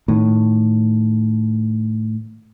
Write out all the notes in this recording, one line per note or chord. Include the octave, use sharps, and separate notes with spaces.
A2 D#3